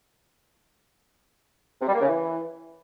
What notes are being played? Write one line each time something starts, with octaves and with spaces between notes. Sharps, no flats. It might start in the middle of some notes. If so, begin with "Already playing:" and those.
C3
G3
A#3
C#3
E3